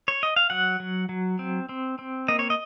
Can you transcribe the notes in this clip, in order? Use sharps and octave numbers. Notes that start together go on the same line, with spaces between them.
C#5
D#5
F5
F#3 F#5
F#3
F#3
C4
C4
C4
A#3 D#5
C#5
D#5